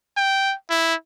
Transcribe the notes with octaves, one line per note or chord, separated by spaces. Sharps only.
G5
E4